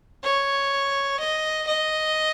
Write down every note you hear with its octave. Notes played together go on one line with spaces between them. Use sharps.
C#5
D#5
D#5